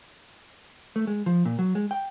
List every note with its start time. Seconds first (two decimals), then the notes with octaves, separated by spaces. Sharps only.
0.96 A3
1.07 G#3
1.26 F3
1.45 A#2
1.59 F#3
1.75 G#3
1.91 G5